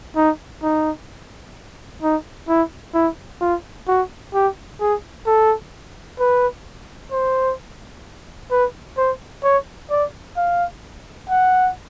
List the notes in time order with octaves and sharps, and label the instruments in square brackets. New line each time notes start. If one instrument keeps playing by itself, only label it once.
[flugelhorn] D#4
D#4
D#4
E4
E4
F4
F#4
G4
G#4
A4
B4
C5
B4
C5
C#5
D5
F5
F#5